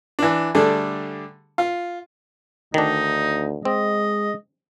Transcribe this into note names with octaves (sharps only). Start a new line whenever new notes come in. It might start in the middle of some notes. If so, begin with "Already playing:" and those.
E3 D4
D3 G3 A3 D4 G#4
F4
D2 D#3 D4 D#4
G#3 C4 D#5